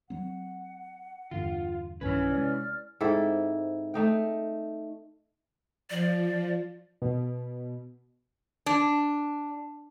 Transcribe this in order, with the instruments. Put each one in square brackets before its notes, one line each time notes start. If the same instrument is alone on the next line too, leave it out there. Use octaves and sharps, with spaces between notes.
[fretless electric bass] F#3 C4 [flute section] F#5
[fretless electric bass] E2 G2 D3 [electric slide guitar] F4
[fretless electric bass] B1 G2 D#3 [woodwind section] C#4 [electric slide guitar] E4 B4 [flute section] G#6
[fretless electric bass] C3 G#3 [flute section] D5 F6
[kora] G#2 C4 E4 A4
A3 D#4 G5
[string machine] F3 [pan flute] D5
[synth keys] B2
[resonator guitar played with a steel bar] D4